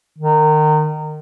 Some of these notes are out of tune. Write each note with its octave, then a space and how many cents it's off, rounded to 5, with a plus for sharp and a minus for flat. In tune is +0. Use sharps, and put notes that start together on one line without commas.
D#3 -25